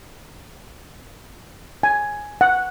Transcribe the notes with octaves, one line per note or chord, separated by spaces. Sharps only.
G#5
F#5